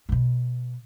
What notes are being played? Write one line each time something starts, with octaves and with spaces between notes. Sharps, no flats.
C3
B2